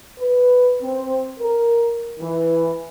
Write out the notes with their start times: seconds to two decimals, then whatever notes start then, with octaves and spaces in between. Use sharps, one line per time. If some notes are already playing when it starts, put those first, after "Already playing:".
0.18 B4
0.81 C4
1.39 A#4
2.19 E3